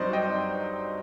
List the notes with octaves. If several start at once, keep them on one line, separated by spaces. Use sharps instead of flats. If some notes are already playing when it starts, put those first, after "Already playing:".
Already playing: G2 F#3 C4 D#4 C5 D5 D#5
D#5 G5